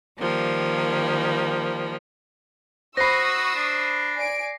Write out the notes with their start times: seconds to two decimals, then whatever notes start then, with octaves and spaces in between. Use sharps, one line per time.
0.19 D#3 F3 G3 A#3
2.97 F#4 C5 B5 C#6 D#6 E6 A#6 C7
3.56 D4
4.15 D5 G#5 D7